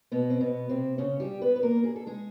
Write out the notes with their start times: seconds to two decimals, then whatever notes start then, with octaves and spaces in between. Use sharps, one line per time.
0.12 B2 B3
0.30 C4
0.41 B2 B3
0.69 C3 C4
0.98 C#3 C#4
1.20 G3 G4
1.41 B3 B4
1.56 B4
1.63 A#3 A#4
1.84 G#4
1.96 A4
2.07 G#3 G#4